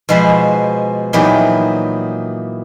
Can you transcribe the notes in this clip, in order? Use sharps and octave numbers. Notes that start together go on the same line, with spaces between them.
B2 F3 G#3 B4 C5
A#2 E3 F#3 B3 D#4 G4